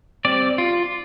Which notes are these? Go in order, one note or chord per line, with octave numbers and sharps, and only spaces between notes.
G3 C4 D5
F4